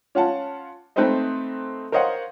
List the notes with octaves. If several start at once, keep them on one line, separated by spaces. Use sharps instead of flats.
C#4 F4 F#5 A5
A3 C4 D#4 B4 C5 D#5
A#4 C5 C#5 D#5 F5 F#5